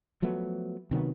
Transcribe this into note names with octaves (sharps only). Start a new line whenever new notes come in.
F3 F#3 A3 B3
C3 D#3 F#3 B3